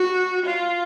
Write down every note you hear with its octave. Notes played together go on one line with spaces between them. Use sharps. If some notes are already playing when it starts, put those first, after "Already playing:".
Already playing: F#4
F4